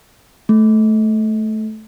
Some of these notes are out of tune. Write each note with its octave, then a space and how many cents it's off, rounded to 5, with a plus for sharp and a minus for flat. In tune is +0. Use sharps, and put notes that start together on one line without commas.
A3 -15